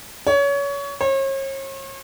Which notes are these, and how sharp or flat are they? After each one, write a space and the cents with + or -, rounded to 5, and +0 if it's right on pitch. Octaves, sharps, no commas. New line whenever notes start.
C#5 +25
C#5 -40